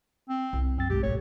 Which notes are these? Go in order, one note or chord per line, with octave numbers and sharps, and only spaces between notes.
C4
C2
F#2 C4 A6
B1 G2 B2 G#3 G4
G#1 D2 A#2 G#3 A3 C#5